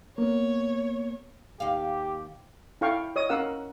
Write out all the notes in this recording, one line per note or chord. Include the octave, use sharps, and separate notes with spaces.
A#3 B3 C#5
D#2 G4 F5
E4 A4 F5 G5 C#6
C#5 D#5 D#6
C#4 A#4 F5 F#5 E6